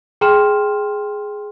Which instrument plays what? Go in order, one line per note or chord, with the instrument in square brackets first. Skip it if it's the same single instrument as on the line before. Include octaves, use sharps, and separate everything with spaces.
[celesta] G#4 G5 A#5 C6 F6 E7